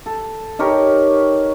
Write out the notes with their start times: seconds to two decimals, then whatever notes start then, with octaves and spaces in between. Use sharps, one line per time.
0.06 A4
0.59 D#4 G4 A#4 C#5